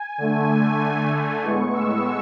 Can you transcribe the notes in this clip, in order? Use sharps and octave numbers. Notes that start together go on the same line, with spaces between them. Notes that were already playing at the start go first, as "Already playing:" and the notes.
Already playing: G#5
D3 A3
G#5
G#5
A2 G#3 B3 C#6
E6